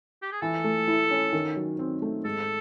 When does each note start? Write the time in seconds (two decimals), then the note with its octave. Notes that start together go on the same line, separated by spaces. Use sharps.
0.22 G4
0.32 G#4
0.41 E3 A4
0.64 A3
0.88 E4
1.11 C#4
1.33 D#3
1.56 F#3
1.79 C4
2.02 A3
2.24 G#2 A4